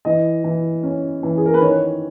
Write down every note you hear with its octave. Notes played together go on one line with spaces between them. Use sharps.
E3 D#5
E3
C#4
E3
G#4
A#4
B4
D#3 C#5